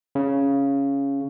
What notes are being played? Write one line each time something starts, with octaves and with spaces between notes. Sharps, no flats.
C#3